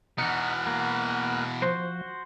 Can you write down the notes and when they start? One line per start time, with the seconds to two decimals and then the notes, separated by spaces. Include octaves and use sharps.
0.18 B2 E3 D#4 F#5 F6 F#6
0.67 A#3
1.62 F3 F#4 C5